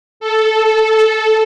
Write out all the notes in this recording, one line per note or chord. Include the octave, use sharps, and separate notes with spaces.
A4